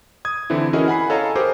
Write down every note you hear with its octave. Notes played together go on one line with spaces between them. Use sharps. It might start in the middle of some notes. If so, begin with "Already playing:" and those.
D#6 G#6
D3 E3 C4 E4
C#4 E4 F#4 G#4 A#4 D#5
F#5 G#5 B5 C7
A4 C#5 D#5 F5 G#5 A#5
G4 G#4 A#4 C5 D6